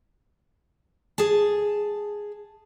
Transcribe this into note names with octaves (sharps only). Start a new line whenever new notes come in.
G#4 A5